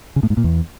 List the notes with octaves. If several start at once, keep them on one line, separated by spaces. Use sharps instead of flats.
C#3
A2
G#2
A#2
E2